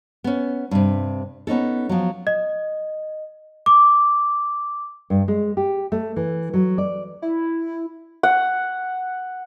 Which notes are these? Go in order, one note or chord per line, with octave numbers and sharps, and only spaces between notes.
B3 C#4
G2 C3
B3 C#4 D#4 A4
F3 F#3
D#5
D6
G2
G#3
G4
A3
E3
F#3
D5
E4
F#5